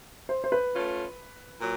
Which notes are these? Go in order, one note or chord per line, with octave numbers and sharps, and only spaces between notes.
C5
C5
B4
A3 C#4 F4
A#2 F#3